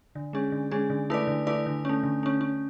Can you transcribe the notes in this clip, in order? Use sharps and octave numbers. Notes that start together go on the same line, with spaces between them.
D3
G#3 C#4 G#4
D3
G#3 C#4 G#4
D3
A3 E4 B4 D5
D3
A3 E4 B4 D5
D3
A3 C#4
D3
A3 C#4
C#4